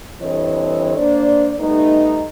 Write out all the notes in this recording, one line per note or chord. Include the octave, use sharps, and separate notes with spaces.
G2 E3 C4 A4 C#5 D#5
A#3 D4 C5 D5
G3 A3 B3 D#4